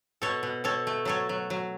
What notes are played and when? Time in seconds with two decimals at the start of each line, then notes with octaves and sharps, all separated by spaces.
0.22 B2 A4 C#5
0.43 B2
0.64 B2 A4 C#5
0.87 A3
1.05 F#3 A4 C#5
1.29 F#3
1.50 F#3